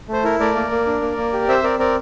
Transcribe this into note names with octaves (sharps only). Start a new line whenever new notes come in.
A3 C5
E4 A#4
A3 A#4 D5
A#3
A#3
D4
A#3
A#3
G4
C4 C5 E5
C4 A#4 D5
C4 A#4 D5